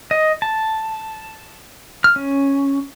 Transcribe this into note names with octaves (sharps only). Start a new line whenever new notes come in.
D#5
A5
F6
C#4